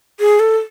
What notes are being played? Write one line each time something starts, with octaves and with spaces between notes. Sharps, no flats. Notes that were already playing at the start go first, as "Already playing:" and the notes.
G#4
A4